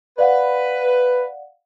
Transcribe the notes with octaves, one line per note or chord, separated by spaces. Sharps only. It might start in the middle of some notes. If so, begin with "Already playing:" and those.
B4 D5 F5 F#5